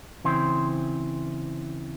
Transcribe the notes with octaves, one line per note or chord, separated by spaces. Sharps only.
C#3 E3 C4 C5